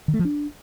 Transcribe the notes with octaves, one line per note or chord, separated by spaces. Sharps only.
D#3
A3
F3
D4